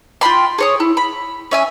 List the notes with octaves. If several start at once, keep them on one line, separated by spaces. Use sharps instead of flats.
F4 G5 B5 C6
G#4 C#5 D#6
E4
B5
C#4 E5 G#5